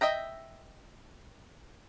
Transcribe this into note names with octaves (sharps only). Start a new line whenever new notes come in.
D#5 E5 G5 A#5